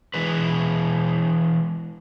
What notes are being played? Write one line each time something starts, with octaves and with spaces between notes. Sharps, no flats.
E3 G#3 B4